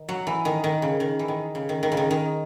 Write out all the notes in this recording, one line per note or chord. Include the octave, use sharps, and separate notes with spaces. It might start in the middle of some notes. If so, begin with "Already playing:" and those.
Already playing: D#3
F#3
E3
D#3
D#3
C#3
D#3
E3
D#3
C#3
D#3
D#3
C#3
D#3
D#3